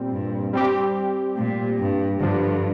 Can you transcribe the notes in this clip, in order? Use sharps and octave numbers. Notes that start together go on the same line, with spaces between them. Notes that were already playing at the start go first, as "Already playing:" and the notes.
Already playing: A#2 G3 C4
G2
G3 C4 G4
A#2
G2
G2 D3 F3 D4